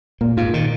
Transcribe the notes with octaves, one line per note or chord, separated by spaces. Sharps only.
A#2 A#3
G#2 F4
A#2 D#3